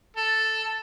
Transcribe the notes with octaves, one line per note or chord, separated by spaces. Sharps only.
A4